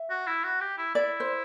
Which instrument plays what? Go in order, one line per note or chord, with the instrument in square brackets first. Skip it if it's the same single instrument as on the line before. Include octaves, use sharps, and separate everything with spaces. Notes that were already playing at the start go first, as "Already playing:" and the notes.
Already playing: [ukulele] E5
[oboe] F#4
E4
F#4
G4
E4
[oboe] E4 [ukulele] D5
[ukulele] C5